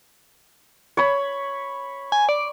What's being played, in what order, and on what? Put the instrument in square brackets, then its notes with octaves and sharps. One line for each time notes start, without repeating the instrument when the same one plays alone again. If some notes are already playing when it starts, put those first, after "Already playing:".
[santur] C#5 B5
[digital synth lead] G#5
D5